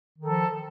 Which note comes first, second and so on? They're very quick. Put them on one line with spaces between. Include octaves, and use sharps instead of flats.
D#3 A4 F3